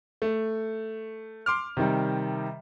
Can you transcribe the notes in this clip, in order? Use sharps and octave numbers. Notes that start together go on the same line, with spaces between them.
A3
C6 D6 F6
C3 D#3 G3